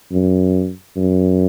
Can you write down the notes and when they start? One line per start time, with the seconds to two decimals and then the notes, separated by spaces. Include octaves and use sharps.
0.12 F#2
0.97 F#2